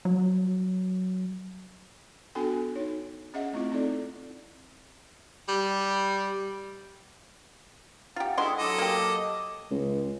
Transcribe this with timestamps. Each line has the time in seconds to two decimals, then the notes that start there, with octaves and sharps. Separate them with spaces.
0.05 F#3
2.35 B3 D4 F#4 A4 G5 G#5
2.75 D#4 C#5
3.34 C#4 G#4 D#5 E5 F#5
3.53 A3 C4 E4 F4
3.72 C4 D#4 A4 D5
5.48 G3
8.16 F4 G4 F#5 A#5
8.37 D3 G#3 E4 F#5 G5 C6 D#6
8.58 F#3 A4 D#5 D6
8.78 A#3 G4 D6
9.71 C#2